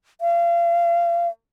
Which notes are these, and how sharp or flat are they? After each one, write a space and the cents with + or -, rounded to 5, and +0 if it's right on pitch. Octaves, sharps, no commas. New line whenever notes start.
F5 -30